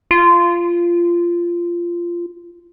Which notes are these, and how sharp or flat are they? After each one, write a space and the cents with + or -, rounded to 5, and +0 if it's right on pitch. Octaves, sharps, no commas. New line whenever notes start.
F4 -15